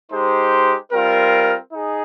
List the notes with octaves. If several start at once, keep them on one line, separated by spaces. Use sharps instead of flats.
G#3 D#4 G4 C5
G3 C4 F4 A#4
D#4 G#4